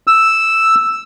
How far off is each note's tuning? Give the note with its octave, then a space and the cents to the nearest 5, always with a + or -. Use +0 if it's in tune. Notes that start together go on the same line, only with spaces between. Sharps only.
E6 +0